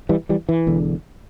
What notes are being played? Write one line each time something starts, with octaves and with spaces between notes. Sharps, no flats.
E3 G3
E3 G3
E3
E1 E2 D3